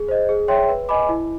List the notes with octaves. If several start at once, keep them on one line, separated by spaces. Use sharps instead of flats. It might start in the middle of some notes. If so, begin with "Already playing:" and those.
Already playing: G#4
C5 D#5
G#4
C#5 E5 G5 C6
B4
D#5 G#5 B5 D6
E4